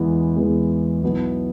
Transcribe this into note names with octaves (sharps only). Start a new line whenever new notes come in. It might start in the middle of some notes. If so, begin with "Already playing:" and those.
Already playing: E2 E3 G#3 B3
E2 E3 G#3 B3
B1 B2 B3 E4